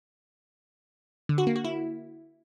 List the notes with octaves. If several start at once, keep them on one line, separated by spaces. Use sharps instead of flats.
D3
F#4
A#3
F#4
E4